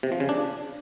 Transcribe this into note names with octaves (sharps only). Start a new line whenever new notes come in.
C3
F3
C#3
D4